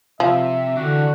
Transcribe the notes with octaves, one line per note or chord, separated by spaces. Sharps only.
C3 F3 E5
D3 E3 D4 F#4